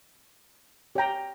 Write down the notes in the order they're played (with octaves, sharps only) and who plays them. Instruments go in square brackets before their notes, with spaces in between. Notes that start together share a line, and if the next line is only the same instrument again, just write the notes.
[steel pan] G4 C#5 G5 A#5